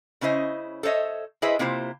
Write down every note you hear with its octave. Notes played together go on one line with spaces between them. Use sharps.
C#3 C#4 E4 C5 D#5
A4 C5 C#5 D#5 E5
E4 G#4 B4 C5 D#5 E5
C3 A#3 E4 F4 C5